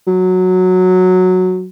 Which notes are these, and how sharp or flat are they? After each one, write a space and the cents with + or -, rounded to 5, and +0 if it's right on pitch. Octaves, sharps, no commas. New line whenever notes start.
F#3 -10